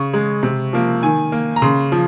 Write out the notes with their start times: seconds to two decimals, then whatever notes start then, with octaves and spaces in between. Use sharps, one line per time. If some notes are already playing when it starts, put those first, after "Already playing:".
Already playing: C#3 C#6
0.14 G#3
0.43 C3
0.73 F3 A#3
1.03 D#3 G#5
1.32 A#3
1.56 A#5
1.62 C#3 C6
1.92 F3